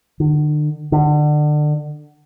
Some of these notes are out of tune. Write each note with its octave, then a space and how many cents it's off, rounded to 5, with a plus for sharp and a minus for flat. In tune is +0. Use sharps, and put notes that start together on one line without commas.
D3 +40
D3 +30